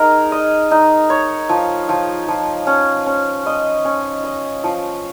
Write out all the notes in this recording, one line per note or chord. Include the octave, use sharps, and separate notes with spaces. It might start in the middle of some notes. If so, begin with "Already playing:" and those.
Already playing: D#4 G#4 A#4
D#5
D#4
C#5
F3
F3
F3
C#4
C#4
D#5
C#4
D#5
F3